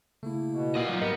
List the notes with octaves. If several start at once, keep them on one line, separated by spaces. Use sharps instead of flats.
C#3 A3 A#3 E4
B2
A#2 D#5 F#5
F#3 D#4 F4
G#2 G3 B3 A#4 D#5